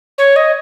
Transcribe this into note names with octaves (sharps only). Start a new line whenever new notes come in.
C#5
D#5